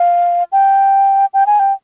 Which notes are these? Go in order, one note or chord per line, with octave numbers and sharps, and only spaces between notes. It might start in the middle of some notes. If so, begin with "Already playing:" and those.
Already playing: F5
G5
G5
G#5
G5